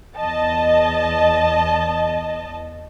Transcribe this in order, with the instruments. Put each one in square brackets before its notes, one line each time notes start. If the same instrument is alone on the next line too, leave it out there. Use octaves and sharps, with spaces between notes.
[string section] E2 D#5 A5